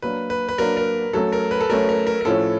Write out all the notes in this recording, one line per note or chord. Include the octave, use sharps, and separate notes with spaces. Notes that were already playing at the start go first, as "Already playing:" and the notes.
F#3 A#3 D4 B4
B4
B4
F#3 A#3 D4 A#4
A#4
F#3 A3 C#4 A4
A#4
B4
A4
F#3 A3 C#4 A#4
A#4
A#4
A#4
A2 F3 A3 C#4 A4